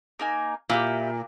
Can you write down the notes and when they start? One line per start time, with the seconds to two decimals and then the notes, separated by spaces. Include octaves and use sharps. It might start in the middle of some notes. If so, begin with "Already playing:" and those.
0.19 A#3 D#4 G#5
0.70 A#2 E4 G4